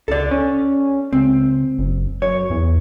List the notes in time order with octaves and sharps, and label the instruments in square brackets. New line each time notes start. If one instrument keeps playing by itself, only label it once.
[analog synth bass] C#2 [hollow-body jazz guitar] A4 D5
[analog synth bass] C#4
[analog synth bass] C#2 [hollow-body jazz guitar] C4
[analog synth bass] F#1
[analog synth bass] F#2 [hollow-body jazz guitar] C#5
[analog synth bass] E2